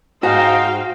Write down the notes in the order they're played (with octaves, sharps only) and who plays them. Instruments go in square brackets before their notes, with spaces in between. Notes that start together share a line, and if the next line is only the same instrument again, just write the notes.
[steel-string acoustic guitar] G#2 [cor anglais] D#4 [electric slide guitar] F#4 [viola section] C5 F5 G5